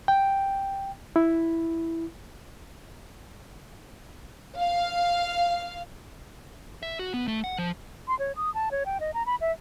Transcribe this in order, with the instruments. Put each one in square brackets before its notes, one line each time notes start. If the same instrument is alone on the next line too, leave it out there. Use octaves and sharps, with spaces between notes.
[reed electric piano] G5
E4
[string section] F5
[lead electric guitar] E5
F#4
B3
A3
F#5
F3
[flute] C6
C#5
D#6
A5
C#5
G5
D#5
A#5
B5
E5